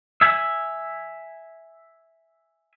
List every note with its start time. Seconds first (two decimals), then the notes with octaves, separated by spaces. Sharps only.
0.21 E5 G#5